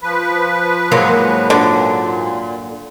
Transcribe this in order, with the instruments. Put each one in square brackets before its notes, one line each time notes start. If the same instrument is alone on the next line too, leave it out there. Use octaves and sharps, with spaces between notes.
[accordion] F3 B4
[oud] G#2 F#3 A#3
[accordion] A#2 [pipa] D3